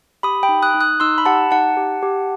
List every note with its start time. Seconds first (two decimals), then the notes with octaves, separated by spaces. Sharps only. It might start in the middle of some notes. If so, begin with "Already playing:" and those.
0.23 G4 B5 D#6
0.43 G5 B5
0.49 D#4
0.62 D#6 F#6
0.74 D#4
0.81 D#6 F#6
1.00 D#4 C6 E6
1.18 B5
1.25 G4 F#5 A5
1.51 D#4 F#5 A5
1.77 G4
2.03 G4